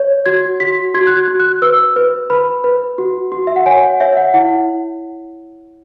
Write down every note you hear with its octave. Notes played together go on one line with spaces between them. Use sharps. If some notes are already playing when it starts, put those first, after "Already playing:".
Already playing: C#5
F#4 G#6
F#4 B6
F#4 G#6
F#6
G#6
F#4
F#6
B4 E6
B4
B4 B5
B4
F#4
F#4
E5
F#5
C#5 G#5
F#5
C#5 E5
F#5
E4 F#5